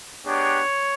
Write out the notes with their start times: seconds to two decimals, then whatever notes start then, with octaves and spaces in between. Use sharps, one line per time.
0.25 G#3 B3 D4 G4 C#5